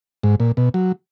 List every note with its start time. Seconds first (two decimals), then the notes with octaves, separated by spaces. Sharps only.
0.23 G#2
0.40 A#2
0.57 B2
0.74 F#3